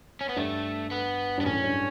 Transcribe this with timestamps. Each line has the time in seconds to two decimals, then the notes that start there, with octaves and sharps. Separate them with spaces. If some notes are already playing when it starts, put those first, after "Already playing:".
0.21 C#4
0.29 B3
0.36 G2 A3
0.91 B3
1.38 G2 B3
1.46 F#2 A2 C#4
1.64 G2